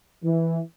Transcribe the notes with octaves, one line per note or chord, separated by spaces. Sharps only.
E3